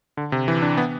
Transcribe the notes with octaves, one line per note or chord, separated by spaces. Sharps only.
D3
C3
E3
D4
B3